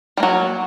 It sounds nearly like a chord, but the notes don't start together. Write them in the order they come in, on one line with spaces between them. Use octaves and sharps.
G3 A#3 F#3